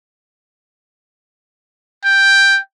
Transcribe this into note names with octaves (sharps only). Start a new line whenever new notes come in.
G5